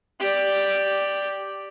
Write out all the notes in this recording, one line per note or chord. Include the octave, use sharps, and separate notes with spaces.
G4 D5